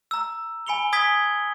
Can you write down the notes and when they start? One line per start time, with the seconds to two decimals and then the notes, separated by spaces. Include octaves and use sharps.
0.11 A#5 E6
0.67 G#5 B5 C#7 F7 G7
0.92 G#5 D#6 G#6 B6 G7